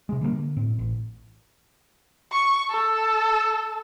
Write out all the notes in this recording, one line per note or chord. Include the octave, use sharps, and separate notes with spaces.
C3 G#3
D3 G3 G#3 A#3
D3
A2 C4
A1
C#6
A4